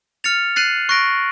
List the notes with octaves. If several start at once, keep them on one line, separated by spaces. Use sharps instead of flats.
F6 A6 C#7 F7
F#6 A6 C7 D#7 F#7
C#6 F#6 A#6 D7